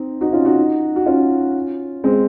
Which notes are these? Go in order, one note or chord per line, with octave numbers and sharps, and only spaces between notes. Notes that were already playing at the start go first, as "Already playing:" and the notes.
Already playing: C4 D#4
D#4 F#4
C#4 F4
D#4 F#4
F#4
C#4 F4
G#3 C4